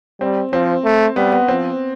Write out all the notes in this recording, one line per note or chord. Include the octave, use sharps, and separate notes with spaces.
G3 C4
F3 C4
A3
G3 B3
B3
F3 C4